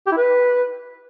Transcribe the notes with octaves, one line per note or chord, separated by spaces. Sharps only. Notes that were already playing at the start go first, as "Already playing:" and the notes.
G4
E4
B4